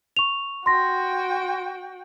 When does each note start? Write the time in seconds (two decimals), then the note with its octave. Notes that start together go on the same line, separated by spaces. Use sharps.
0.17 C#6 F7
0.66 F#4 G5 C6 A#6